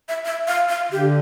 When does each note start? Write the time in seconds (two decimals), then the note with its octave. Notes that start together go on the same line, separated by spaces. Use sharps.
0.09 E5
0.25 E5
0.47 F5
0.69 F5
0.92 D3 G4